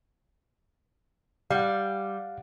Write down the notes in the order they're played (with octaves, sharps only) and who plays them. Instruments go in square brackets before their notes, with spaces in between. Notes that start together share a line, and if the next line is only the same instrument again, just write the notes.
[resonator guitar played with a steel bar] G3 [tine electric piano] F5 F#5